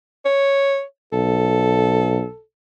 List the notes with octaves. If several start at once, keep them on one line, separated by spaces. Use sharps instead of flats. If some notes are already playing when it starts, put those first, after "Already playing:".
C#5
B1 A4